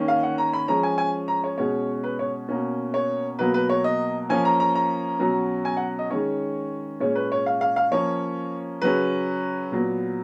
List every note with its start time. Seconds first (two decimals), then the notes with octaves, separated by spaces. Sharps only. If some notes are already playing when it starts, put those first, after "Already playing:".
Already playing: D#3 A#3 C#4
0.08 F5
0.23 F#5
0.38 A#5
0.53 B5
0.68 F3 G#3 C#4 A#5
0.83 G#5
0.98 G#5
1.28 A#5
1.44 C#5
1.58 B2 G#3 C#4 C#5
2.04 B4
2.19 C#5
2.49 B2 A#3 C#4
2.94 C#5
3.39 B2 F#3 A#3 B4
3.54 B4
3.69 C#5
3.84 D#5
4.29 F3 A#3 C#4 G#5
4.45 A#5
4.60 A#5
4.75 A#5
5.19 B2 F#3 C#4
5.65 G#5
5.77 F#5
5.99 D#5
6.10 D#3 G#3 C#4 C#5
7.00 A#2 G#3 C#4 C#5
7.15 B4
7.32 C#5
7.46 F5
7.61 F5
7.76 F5
7.91 F3 A#3 C#4 C#5
8.82 C#3 F#3 C#4 B4
9.72 A#2 F#3 B3